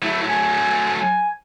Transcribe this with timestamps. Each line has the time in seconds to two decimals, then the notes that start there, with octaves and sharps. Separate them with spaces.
0.02 F#3 A3 E4
0.27 G#5
0.99 G#5